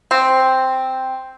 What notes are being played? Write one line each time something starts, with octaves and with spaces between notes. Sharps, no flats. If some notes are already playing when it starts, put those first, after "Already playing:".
C4